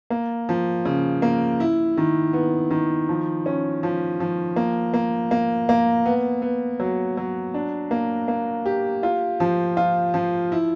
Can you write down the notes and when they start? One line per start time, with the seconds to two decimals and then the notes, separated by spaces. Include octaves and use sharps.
0.10 A#3
0.49 F3
0.85 C#3
1.22 A#3
1.60 E4
1.97 D#3
2.33 B3
2.70 D#3
3.09 F3
3.46 C#4
3.83 F3
4.20 F3
4.56 A#3
4.94 A#3
5.31 A#3
5.69 A#3
6.06 B3
6.42 B3
6.80 F#3
7.17 F#3
7.54 D4
7.91 A#3
8.28 A#3
8.66 G4
9.03 F4
9.40 F3
9.77 F4
10.14 F3
10.52 E4